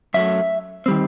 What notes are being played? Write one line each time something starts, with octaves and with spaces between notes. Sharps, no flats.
F#2 F#3 A3 E5
D#3 G3 C4